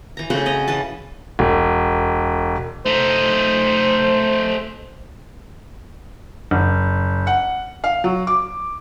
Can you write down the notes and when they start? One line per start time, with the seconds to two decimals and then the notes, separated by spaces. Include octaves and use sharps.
0.17 E3 A#5
0.30 C#3 A3 C4 F#4
0.46 C#4 D#5 A#5
0.68 E3 B4 A5
1.39 E1
2.86 A3 D#4 C5
6.51 F#1
7.27 F#5
7.84 F5
8.04 F#3
8.27 D6